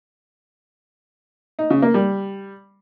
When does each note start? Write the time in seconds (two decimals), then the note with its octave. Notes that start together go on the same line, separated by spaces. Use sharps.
1.59 D#4
1.70 C#3
1.82 A#3
1.94 G3